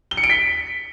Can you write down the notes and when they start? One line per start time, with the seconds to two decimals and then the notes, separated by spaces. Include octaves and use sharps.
0.11 G7
0.17 C#7
0.23 D7
0.30 B6